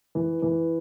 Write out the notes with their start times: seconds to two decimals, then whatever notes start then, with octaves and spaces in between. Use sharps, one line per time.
0.15 E3
0.42 E3